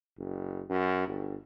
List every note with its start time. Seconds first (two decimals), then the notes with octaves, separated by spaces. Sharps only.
0.18 F#1
0.70 F#2
1.08 G1